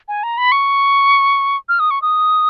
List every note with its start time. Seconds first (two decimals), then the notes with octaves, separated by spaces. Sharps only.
0.08 G#5
0.23 A#5
0.38 B5
0.52 C#6
1.69 F6
1.80 D#6
1.91 C#6
2.02 D#6